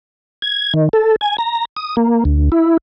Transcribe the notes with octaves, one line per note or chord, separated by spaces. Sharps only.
G#6
D#3
A4
G#5
A#5
D#6
A#3
D2
E4